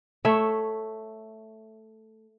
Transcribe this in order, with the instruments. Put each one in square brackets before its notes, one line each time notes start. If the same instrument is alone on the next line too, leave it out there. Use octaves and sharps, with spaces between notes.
[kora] A3 C#5 E5